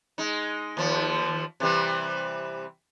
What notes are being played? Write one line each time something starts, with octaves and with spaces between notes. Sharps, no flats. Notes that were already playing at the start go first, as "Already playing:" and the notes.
G#3 D#4
D#2 F3
C3 E3 G3